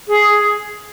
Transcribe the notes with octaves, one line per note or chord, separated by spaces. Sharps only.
G#4